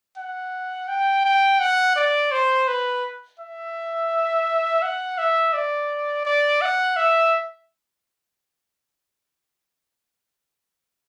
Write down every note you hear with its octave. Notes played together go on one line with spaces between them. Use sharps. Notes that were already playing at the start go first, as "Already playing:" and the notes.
F#5
G5
G5
F#5
D5
C5
B4
E5
F#5
E5
D5
D5
F#5
E5